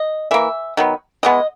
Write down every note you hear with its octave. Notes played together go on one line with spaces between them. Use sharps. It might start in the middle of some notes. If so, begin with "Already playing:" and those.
Already playing: D#5
E3 A#3 E5
D#3 F#3 B3
E3 G#3 B3 D#5